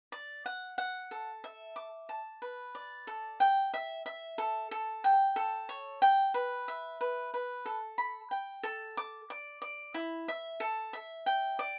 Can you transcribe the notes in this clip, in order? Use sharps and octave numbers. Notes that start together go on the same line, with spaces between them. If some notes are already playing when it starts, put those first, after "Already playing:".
D5
F#5
F#5
A4
E5
D6
A5
B4
D5
A4
G5
E5
E5
A4
A4
G5
A4
C#5
G5
B4
E5
B4
B4
A4
B5
G5
A4
D6
D5
D5
E4
E5
A4
E5
G5
D5